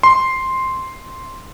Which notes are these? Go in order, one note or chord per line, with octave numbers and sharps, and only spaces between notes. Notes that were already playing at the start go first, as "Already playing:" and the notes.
C6